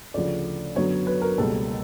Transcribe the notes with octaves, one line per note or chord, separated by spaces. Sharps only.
D2 C#3 F3 D5
F#2 D3 F#3 B3 C#5
B4
A#4
C#2 B2 G3 A#3 A4